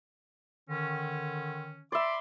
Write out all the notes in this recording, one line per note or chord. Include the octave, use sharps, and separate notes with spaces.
D3 D#3 C#4
D5 E5 B5 C6 D6